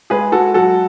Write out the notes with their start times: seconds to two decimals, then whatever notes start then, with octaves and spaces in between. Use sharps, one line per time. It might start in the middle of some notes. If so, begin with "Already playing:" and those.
0.10 G#3 G#4 B4
0.32 G#3 F#4 A4
0.54 F#3 F#4 A4